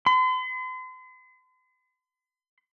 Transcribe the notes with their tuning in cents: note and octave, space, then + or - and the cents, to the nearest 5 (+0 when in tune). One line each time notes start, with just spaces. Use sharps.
C6 -45